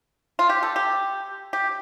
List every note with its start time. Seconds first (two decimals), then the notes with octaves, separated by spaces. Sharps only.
0.39 F4
0.49 G4
0.63 A4
0.76 G4
1.53 G4